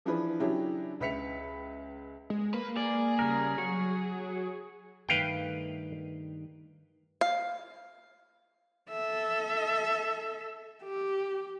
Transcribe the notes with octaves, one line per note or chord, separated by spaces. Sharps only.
E3 F3 D4 E4 G#4 B4
C#3 F#3 D4 E4 G4 G#4
C#2 B4 E5 B6 C#7 F7
G#3
A#3 B4
G#4 D5
C#3 G3 A#4
F#3 C#6
G2 D#3 A3 B4 F5 G5
F5
A4 E5
G4